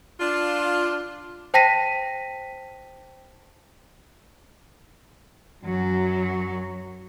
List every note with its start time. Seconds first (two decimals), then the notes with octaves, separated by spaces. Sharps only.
0.20 D4 F4
1.54 C5 G5 A5 A#6 B6 D#7
5.65 F#2 F#3